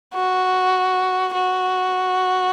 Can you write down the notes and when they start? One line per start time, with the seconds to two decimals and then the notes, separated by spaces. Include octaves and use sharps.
0.15 F#4
1.34 F#4